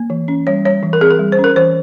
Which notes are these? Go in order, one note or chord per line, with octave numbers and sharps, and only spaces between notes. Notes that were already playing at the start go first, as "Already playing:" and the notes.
Already playing: A#3
E3
C#4
G3 C#5
G3 C#5
E3
A#4
C4 G#4
A#4
G3
C5
C#4
A#4
E3 C5